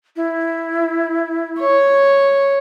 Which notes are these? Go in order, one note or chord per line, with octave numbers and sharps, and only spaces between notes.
E4
C#5